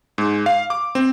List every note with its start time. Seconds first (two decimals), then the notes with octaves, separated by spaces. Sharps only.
0.18 G#2
0.46 F5
0.70 D6
0.95 C4